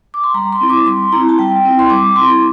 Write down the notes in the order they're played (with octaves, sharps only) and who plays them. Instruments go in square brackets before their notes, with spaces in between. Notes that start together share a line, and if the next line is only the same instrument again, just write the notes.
[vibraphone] D6
C6
G3 A#5
C6
C4 E4
D6
G3 C6
C4 E4 A#5
A5
G3 G5
C4 E4
C6
G3 D6
C4 E4 C6